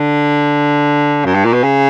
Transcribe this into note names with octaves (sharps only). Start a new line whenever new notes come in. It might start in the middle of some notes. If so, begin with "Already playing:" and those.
Already playing: D3
F#2
G2
A#2
B2
C#3